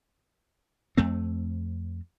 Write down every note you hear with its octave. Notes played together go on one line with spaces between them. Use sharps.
F2 A3 C4